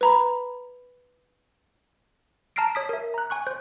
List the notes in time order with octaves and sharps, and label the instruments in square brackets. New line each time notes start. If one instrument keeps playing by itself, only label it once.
[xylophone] B4 A#5 B5
[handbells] A5 A#5 F6 A#6 C7 D7
C#5 D#6 B6
A#4 E5
A#5 F#6
G#5 C#6 F#6
C5 F#6